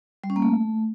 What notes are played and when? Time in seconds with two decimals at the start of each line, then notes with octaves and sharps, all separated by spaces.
0.24 G3
0.30 C#4
0.36 A#3
0.42 A3